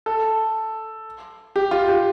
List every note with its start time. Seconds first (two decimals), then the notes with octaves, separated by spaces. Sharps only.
0.06 A4
1.56 G4
1.71 F4
1.88 G4